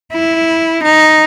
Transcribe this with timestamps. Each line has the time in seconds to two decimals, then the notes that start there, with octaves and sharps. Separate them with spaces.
0.13 E4
0.83 D#4